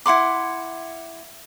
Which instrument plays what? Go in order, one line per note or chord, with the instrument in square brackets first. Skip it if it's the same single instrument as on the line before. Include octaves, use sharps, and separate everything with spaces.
[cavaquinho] E4 F#5 C6 D6